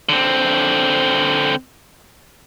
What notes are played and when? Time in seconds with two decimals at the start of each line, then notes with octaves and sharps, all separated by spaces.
0.09 D3 C4